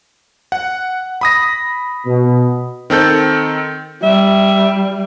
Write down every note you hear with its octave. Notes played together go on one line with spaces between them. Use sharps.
F#5
B5 D#6 A#6
B2
D#3 C4 A4 G6
G3 E5